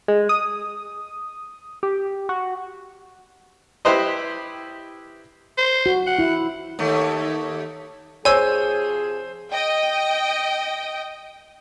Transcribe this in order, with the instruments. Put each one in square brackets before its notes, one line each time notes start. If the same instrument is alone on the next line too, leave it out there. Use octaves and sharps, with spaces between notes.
[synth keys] G#3
D#6
G4
F#4
[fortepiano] E4 G4 B4 C5 D#5
[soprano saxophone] C5
[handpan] F#4
[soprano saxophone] F#5
[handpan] E4
[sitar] D#2 A3
[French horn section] C3 F3 G#4 [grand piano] C5 [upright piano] C#5 [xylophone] G#5 E6
[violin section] D#5 G5